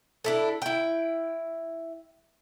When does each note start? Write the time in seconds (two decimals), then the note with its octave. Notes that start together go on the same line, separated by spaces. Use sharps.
0.24 D4 E4 A4
0.62 E4 G5